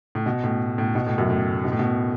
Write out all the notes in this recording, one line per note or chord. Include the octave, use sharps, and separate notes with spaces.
A2
B2
A2
A2
B2
A2
F#2
A2
B2
A2
B2